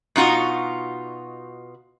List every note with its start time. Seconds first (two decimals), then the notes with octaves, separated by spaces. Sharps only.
0.16 B2 D#4 F4 F#4